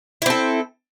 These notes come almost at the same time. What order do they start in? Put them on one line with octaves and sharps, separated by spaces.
E4 C4 A4